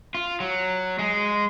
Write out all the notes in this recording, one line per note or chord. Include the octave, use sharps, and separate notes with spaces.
F4
F#3
G#3